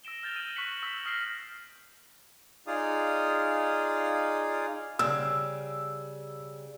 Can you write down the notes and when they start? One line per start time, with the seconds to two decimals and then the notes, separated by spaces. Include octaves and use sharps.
0.04 E6 A#6 D7 E7 G7
0.23 F6 G6 A6 F7 G7
0.36 E6 G6 D#7 F#7 G7
0.56 C#6 F#6 A#6 B6 C#7 F#7
0.82 C#6 E6 F#6 B6 E7
1.05 D#6 F6 A#6 C7 D7
2.67 D#4 F4 G#4 D5 F5 D#6
4.99 C#3 G3 E6